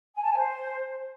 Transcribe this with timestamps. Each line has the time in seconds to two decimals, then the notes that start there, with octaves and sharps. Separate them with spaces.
0.15 G#5
0.22 A5
0.29 G#5
0.37 C5